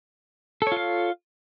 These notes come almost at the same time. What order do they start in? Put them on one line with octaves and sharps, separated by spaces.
A4 C#5 F4 F5